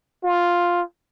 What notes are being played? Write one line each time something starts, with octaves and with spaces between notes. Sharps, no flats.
F4